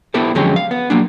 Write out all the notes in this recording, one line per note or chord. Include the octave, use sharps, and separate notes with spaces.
B3 E4 G4 A4 C5
F2 D3 F#3 G#3 C#4 G4
F5
B3
F#3 A#3 D4